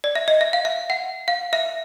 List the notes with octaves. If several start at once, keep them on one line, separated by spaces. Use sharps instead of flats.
D5
E5
D#5
E5
F5
E5
F#5
F5
E5